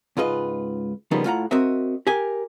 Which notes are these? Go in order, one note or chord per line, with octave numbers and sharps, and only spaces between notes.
C#2 G#2 F4 B4 D#5
C#3 F3 G3 A#3 B3 D#4
A2 F4 F#5 A#5
C4 F#4 A#4 D#5 E5
G4 A#4 G#5